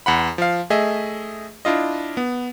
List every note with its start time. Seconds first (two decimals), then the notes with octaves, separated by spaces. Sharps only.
0.06 E2 F#5 B5
0.38 F3 F5
0.70 A3 G#4 D#5 E5
1.65 D4 E4 F4 D#5
2.17 B3